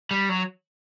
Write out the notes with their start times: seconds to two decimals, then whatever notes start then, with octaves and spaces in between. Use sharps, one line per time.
0.11 G3
0.29 F#3